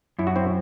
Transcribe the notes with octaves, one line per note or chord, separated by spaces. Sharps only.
F#2 E4
F#4
C4 E4